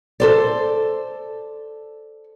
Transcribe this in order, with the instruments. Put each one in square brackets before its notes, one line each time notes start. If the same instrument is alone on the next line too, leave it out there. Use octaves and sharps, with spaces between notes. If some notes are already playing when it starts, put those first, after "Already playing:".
[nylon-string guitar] A4 C5 D5